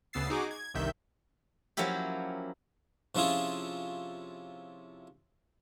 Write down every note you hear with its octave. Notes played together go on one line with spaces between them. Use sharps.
D2 C#3 B3 E6 A6 C7
D#4 F#4 G#4 D6
G#6
G1 C2 C3 D#3 E5 G6
F3 F#3 A#3 C#4 E4 G4
C3 F3 C#4 E4 F4 G#4